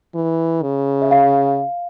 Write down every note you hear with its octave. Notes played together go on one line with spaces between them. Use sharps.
E3
C#3
E5
F5